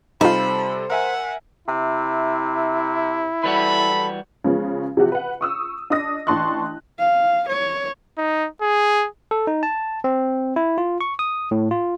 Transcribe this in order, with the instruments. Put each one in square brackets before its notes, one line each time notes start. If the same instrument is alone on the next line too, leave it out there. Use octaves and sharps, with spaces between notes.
[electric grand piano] C3 G3 A4 [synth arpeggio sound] D#4 F4 [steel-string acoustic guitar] C5 [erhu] B5
[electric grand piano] A#4 E5 G#5 [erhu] F#5
[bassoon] C3 [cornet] E4
[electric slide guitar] E3 G3 F#4 [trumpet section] A4 B5
[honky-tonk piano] C#3 F3 G#3 B3 C#4
C3 F3 F#4 G4
B4 F#5
C#6 D#6 E6
D4 D#5 D#6 A#6
A1 D4 A5 C6 C#6 F#6
[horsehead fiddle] F5
C#5
[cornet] D#4
G#4
[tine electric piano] A4
D#4
A5
C4
E4
F4
C#6
D#6
A2
F4